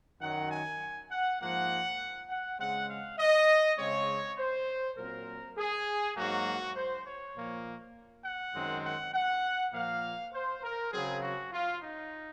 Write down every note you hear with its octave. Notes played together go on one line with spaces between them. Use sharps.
F#2 D#3 F#3 F#5
G#5
F#5
G#2 F3 A#3 F#5
F#5
C#3 G#3 C4 F#5
F5
D#5
C#3 G#3 C4 C#5
C5
A#2 F#3 C4 A#4
G#4
G#2 F#3 A#3 F#4
C5
C#5
A#2 F3 A#3
F#5
F#2 D#3 G#3 C4
F#5
F#5
A#2 F3 A#3 F5
C5
A#4
C#3 F#3 C4 G#4
F#4
F4
D#4